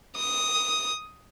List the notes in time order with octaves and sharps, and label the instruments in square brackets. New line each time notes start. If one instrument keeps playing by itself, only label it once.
[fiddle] D#6